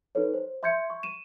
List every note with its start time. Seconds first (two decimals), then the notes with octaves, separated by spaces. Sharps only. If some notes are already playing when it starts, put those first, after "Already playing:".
0.15 D#4 A4 B4 C#5
0.34 C5
0.63 E5 C6 G6 G#6 C#7
0.90 C#6
1.03 D#7 E7